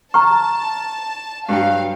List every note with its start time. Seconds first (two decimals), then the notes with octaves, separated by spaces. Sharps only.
0.14 A5 A#5 C#6 F6
1.49 G2 F#3 F5 G5